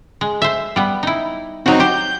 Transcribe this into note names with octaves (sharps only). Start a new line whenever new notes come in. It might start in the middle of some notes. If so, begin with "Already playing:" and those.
G#3
C5 E5
G3 B3
D#4 E4
F#3 C4 D#4 F#4
G4 C5 G6